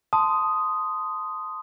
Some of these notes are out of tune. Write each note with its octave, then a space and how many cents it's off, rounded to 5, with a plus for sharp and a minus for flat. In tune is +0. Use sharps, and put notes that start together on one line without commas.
A5 +0 C6 -15 D#6 +0